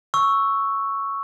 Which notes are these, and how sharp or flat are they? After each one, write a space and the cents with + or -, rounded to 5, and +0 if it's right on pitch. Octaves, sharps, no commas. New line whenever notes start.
C#6 +0 E6 +0